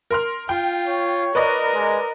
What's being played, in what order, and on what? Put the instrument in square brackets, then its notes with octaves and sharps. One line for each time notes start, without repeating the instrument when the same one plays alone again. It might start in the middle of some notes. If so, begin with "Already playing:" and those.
[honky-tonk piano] A#4 C6 F6
[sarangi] F4 [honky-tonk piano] G5
[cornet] C#5
[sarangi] A#4 [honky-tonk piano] B4 D5 D#5
[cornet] G#3